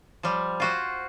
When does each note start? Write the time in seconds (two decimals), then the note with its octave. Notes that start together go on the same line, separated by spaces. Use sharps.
0.23 F3 G3
0.60 F4 F#4 C5